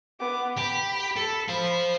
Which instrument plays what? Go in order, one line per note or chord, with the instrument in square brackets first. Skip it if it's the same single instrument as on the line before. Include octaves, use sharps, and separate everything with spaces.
[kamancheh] B3 D6
[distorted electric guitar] G4 [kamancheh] B5
[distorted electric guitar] A4
C5 F5